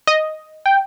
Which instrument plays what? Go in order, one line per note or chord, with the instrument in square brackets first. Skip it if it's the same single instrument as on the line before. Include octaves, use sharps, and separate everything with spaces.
[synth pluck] D#5
[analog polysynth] G5